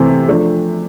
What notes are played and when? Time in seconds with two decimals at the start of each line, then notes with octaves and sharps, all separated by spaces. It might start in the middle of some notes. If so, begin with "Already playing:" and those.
Already playing: C3 E3 A3 C4
0.28 F3 A3 D4